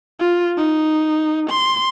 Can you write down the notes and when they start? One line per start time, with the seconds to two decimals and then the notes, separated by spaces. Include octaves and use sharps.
0.20 F4
0.57 D#4
1.50 C6